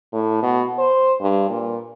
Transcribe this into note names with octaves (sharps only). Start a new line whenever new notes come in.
A2
B2
C5
G2
A#2